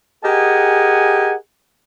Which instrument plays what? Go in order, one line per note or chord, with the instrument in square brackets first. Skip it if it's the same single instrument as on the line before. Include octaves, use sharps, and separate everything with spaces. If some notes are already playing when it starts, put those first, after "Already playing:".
[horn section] G4 G#4 A#4 D#5 F#5 G#5